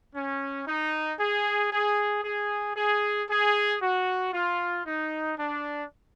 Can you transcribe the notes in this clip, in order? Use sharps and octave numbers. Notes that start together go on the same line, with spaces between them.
C#4
D#4
G#4
G#4
G#4
G#4
G#4
F#4
F4
D#4
D4